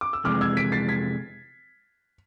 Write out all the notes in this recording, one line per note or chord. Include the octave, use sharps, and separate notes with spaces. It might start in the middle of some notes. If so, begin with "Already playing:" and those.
D6
E6
F2 C3 E3 G#3 D6 F6
E6 G#6
B6 D7
A6 C7
G#6 B6